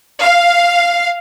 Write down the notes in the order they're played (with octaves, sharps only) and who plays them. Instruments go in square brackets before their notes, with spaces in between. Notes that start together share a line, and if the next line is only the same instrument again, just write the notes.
[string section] F5